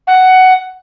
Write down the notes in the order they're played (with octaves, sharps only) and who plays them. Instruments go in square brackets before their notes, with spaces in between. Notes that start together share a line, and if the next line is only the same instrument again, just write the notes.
[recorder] F#5